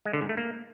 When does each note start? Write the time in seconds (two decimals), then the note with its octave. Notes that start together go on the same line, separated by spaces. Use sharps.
0.05 G#3
0.13 D3
0.21 G#2
0.29 A3
0.37 A#3